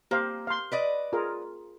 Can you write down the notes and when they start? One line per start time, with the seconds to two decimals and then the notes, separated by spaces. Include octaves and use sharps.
0.11 A#3 G4 C5 F5
0.47 F5 C6
0.72 B4 D5 D#5
1.13 F4 G#4 A#4